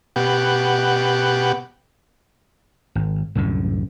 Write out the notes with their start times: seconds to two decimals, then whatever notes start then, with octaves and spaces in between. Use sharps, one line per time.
0.16 B2 G4 F#5
2.95 G#1
3.35 C2 F#2 A2 D3